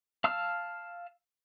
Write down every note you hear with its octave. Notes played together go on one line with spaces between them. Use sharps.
F5 A5 E6 F6